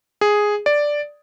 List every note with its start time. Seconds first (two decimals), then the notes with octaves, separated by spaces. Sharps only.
0.21 G#4
0.66 D5